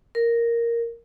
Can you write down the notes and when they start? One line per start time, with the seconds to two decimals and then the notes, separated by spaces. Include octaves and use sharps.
0.15 A#4